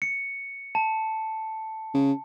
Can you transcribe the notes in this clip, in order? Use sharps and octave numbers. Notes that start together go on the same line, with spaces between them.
C#7
A5
C#3